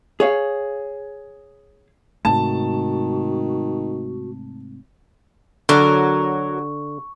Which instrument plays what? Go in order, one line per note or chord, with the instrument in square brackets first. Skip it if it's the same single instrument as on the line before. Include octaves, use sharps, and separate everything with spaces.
[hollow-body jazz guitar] G#4 C#5 F5
[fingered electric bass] G#2 C3 A3 [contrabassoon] D#3 [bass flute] F#4 [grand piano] A5
[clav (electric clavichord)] D3 [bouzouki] F#3 A#4 [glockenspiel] C#6